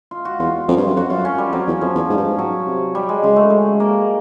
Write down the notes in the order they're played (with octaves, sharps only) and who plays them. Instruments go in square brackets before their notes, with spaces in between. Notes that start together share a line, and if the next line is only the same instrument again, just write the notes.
[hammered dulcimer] F4
F#4
[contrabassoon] E2 [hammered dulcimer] F4
[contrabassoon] F2
G2
F#2
[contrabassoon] F2 [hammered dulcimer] F#4
[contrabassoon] F#2 [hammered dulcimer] F4
[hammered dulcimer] C#4
G3
[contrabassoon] F2 [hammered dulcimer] F#3
[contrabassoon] E2
[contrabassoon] F2 [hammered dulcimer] F3
[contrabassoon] E2
G#2
G2
G#2
[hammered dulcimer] F#3
[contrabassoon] C3
[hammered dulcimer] G3
G#3
[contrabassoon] C#3 [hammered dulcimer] G#3
[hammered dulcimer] A3
G#3
A#3